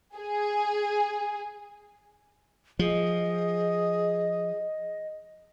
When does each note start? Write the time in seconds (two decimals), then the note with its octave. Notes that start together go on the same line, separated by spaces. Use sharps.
0.16 G#4
2.79 F3 G#4 D#5